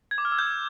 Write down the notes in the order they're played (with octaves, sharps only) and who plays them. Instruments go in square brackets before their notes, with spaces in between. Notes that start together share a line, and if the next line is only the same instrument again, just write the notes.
[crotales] G#6
D6
F6
E6
G6